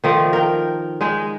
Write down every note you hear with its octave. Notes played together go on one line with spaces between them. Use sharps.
D#3 F3 A3
A#4 G5
G#3 D#4 G#4